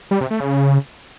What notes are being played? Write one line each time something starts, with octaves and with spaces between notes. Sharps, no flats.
G3
C3
A3
C#3